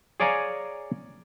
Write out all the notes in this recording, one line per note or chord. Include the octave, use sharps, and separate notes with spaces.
G#4 C#5 D5 F5 G#5 A#5